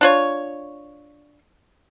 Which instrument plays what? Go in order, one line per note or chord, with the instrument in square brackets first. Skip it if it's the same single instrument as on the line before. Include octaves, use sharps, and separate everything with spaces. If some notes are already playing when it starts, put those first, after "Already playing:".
[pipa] D4 F4 C#5